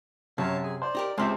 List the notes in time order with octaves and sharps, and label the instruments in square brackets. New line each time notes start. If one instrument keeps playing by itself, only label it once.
[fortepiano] F#2 [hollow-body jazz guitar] C3 [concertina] C#5 F5 A5
[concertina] G#4 G#5
[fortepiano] C5 [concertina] D5
[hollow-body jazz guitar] D#4 G4 A#4
[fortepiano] C#2 C5 E5 [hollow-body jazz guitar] G#3 C4 [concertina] G4